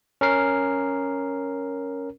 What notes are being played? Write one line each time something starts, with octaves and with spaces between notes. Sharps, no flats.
C#4 A#4 C7